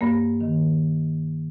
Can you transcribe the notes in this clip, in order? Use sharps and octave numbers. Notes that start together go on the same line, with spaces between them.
G2 A#3
D#3